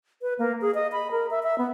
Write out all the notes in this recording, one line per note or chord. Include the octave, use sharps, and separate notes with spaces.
B4
A#3
G#4
D#5
B5
A#4
E5
E5
B3